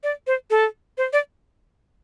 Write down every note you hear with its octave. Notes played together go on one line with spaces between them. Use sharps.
D5
C5
A4
C5
D5